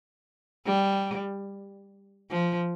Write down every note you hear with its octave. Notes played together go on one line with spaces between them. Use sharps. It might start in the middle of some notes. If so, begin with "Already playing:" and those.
G3
F3